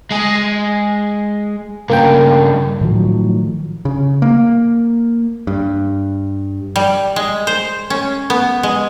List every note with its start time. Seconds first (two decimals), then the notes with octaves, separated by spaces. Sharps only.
0.11 G#3 G#4
1.90 G2 C#3 A#3 G5
2.81 A2 D#3 F3 F#3
3.85 C#3
4.22 A#3
5.47 G2
6.76 G3
7.16 G#3
7.47 C5
7.90 C#4
8.30 B3
8.63 G#3